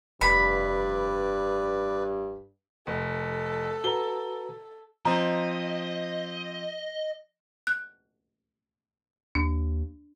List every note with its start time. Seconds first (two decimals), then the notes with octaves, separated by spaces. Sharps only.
0.21 F1 G2 B4 D5 B5
2.87 F1 A4
3.84 F#4 B4 A#5 G7
5.05 F3 C4 D#5 A#5
7.67 F#6
9.35 D#2 D4